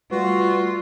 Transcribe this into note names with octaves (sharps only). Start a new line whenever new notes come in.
G3 A3 F4 F#4 B4